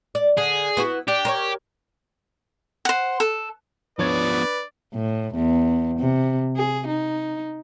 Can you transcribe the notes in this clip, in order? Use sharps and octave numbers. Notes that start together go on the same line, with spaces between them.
D5
D3 G#4
B3 E4 F#4
D4 G4
A#4 C5 C#5
C5 F#5
A4
F3 B3 D4 B4 C#5 D5 G#6
A2
E2
C3
G#4
D#4